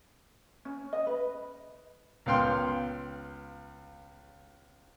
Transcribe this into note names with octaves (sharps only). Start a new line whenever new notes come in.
C#4
D#5
B4
C#2 B3 F5 G5 C6